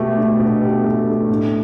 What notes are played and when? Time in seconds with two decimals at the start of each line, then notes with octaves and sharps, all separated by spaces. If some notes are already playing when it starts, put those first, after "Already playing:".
Already playing: B2 A3 G4
0.17 D4
0.39 B2
0.62 G4
0.84 A3
1.07 D4
1.29 A2